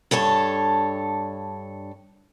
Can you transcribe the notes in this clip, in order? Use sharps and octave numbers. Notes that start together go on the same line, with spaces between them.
G2 A4 C#5 A5